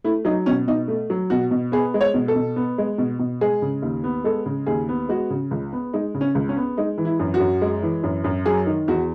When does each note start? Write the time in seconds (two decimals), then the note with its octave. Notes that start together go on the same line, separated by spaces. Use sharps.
0.04 A3 E4
0.25 F#3 D#4
0.46 B2 C#4
0.68 B2 D#4
0.88 A3
1.10 F#3
1.30 B2 F#4
1.51 B2
1.72 B3 G#4
1.94 G#3
2.01 C#5
2.14 B2
2.28 A4
2.35 B2
2.56 B3
2.78 G#3
2.98 B2
3.19 B2
3.41 G#3 G#4
3.62 C#3
3.82 D#2
4.04 B3
4.24 G#3 A4
4.46 C#3
4.67 D#2 G#4
4.89 B3
5.09 G#3 F#4
5.30 C#3
5.51 C#2
5.73 B3
5.94 G#3 D#4
6.14 C#3
6.21 C#4
6.35 C#2
6.49 C#4
6.57 B3
6.77 G#3 D#4
6.98 E3
7.05 E4
7.19 F#2
7.34 F#4
7.40 F#2
7.62 G#3
7.83 E3
8.03 F#2
8.24 F#2
8.46 F#3 G#4
8.66 D#3
8.88 E2 F#4